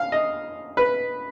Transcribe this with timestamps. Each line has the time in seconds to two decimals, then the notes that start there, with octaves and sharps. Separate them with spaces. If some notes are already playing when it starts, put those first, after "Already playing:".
Already playing: F5
0.12 D#5
0.77 B4